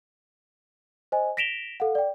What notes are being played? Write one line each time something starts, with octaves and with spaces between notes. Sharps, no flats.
C5 D#5 G#5
A#6 B6 D7 E7 F7 G7
A4 F5 F#5
D5 G5